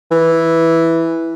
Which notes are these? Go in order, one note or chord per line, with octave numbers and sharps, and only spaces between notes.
E3